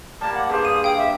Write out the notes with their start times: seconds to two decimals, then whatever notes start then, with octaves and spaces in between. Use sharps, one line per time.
0.21 G3 A#3 A5
0.34 F#5
0.50 G2 G4 G#4 C5 A5
0.65 D#6 D#7
0.84 F5 G5 D#6
0.98 E5